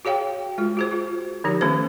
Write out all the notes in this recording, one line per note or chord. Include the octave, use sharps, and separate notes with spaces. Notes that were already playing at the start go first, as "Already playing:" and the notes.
F#4 G#4 C#5 F5 G5
G#3 F4
F#4 G#4 C5
F4
D3 F3 D#4 G4
D#3 A3 B3 C#4 A4 C5